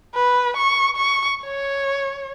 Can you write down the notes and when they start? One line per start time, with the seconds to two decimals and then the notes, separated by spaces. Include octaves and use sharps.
0.14 B4
0.57 C#6
0.96 C#6
1.43 C#5